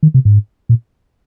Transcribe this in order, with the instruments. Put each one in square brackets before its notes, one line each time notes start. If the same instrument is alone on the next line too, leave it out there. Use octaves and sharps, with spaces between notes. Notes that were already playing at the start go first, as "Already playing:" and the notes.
[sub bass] D#3
C3
G#2
A#2